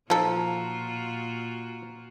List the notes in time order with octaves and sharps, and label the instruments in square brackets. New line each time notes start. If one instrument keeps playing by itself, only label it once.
[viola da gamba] A#2 F4 F#4 [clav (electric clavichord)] F3 [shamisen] D#4 A4 [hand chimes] A#5